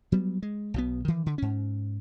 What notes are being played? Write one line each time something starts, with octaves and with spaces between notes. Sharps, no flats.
F#3 G3 B3
G#3
B1 B2 B3
D#3 E3
D3
G#2 C#4